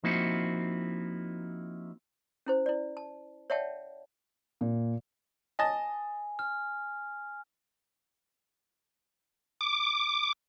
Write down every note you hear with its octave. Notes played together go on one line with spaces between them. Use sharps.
F3 A#3 C4 D#4 E4 F#4
C#4 E4 C5
E4 D5
A5
C#5 D5 E5 F#5 G5 A5
A#2
D#5 G#5 A5
F6
D6